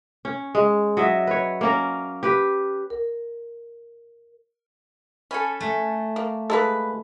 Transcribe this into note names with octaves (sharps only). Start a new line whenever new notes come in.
C#4
G#3
F#3 D#5 E5
B4 C#5
A#3 C#4 A#4
G4 B4
A#4
C#4 A4 G#5 B5
A3
A#3
G#3 A#3 A4 B4